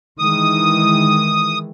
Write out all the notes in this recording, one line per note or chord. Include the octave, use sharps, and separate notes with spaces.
D#3 E3 G#3 D#6